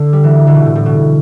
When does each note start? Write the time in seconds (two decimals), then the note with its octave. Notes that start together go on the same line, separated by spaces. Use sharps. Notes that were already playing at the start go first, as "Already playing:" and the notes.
Already playing: D3
0.13 G3
0.24 E3
0.47 D3
0.54 B2
0.65 A2
0.75 A2
0.85 B2